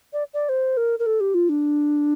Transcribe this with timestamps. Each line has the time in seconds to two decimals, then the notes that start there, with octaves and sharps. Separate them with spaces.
0.13 D5
0.34 D5
0.49 C5
0.77 A#4
0.99 A#4
1.06 A4
1.20 G4
1.34 F4
1.49 D4